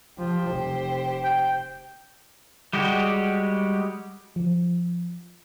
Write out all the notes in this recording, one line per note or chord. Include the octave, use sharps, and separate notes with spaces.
F3 G4 C5
F1
G5
G3 G#3 F#4 G4
F3